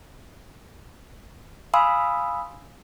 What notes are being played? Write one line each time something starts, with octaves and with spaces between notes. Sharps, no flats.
F5 G#5 B5 C6 D#6 E6